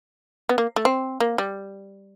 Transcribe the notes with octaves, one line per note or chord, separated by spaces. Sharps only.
B3
A#3
A3
C4
A#3
G3